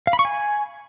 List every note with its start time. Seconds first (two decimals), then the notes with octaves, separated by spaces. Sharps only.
0.07 F5
0.13 B5
0.19 C#6
0.25 G#5